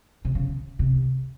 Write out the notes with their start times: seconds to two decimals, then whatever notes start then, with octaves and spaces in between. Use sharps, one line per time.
0.25 C3
0.35 C#3
0.79 C3